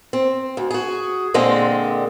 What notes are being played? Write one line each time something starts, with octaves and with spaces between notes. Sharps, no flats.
C4
D2
F#4 G#4
A#2 D3 G#3 C4